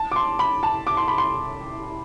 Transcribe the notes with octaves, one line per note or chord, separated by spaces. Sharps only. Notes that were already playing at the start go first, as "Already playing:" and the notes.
Already playing: A5
D6
C6
B5
A5
D6
C6
B5
C6